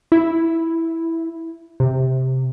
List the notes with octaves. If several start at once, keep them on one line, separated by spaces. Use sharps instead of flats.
E4
C3